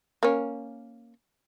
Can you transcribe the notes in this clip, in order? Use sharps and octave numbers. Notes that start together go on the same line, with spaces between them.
A#3 C#4